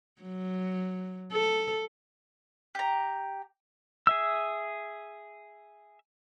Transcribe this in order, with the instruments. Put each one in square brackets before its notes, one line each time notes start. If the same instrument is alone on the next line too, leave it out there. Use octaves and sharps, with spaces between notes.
[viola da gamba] F#3
A4
[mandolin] G4 A#5
[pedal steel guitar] G#4 E5 E6